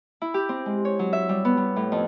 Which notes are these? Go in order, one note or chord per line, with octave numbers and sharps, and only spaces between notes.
E4
G4
C4
G#3
C#5
F#3
E5
G3
B3
G3
A2
F2